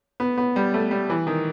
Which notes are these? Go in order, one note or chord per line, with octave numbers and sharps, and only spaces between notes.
B3
B3
G3
A3
G3
E3
D#3